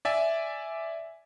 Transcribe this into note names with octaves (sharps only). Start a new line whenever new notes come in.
D5 E5 G#5